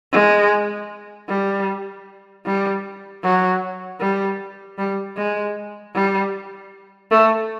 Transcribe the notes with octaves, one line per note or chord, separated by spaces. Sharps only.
G#3
G3
G3
F#3
G3
G3
G#3
G3
A3